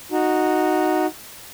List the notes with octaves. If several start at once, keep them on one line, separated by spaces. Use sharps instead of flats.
D#4 F#4